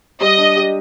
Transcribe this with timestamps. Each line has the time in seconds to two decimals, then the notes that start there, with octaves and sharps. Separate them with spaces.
0.21 G3 D#5
0.38 D4
0.56 G4